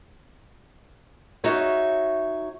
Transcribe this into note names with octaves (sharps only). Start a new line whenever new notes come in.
D#4 F#4 C#5 E5